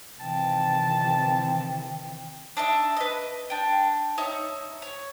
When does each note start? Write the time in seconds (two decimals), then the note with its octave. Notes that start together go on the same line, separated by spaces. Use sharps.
0.20 C3 D#3 E3 G5 A5
2.57 D4 D#4 E5
2.97 B4 D#5
3.50 D4 G5
4.18 D#4 C#5 E5 D#6
4.82 C#5